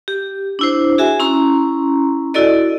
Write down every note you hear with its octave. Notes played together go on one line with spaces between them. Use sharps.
G4
D4 E4 C5
F#4 G#4 E5 G#5
C#4 E4 A#5 C6
E4 F#4 A4 D5 D#5